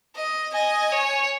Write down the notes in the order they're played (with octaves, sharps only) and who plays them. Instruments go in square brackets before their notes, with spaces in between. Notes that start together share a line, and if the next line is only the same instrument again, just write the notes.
[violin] D#5
[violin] D#5 [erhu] G#5
[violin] C#5